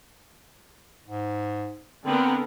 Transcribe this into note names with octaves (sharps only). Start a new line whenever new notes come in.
G#2
D3 B3 C4 A#4